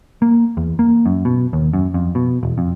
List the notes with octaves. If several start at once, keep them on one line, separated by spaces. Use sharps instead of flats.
A#3
E2
A#3
F#2
B2
D#2
F#2
F2
B2
E1
F2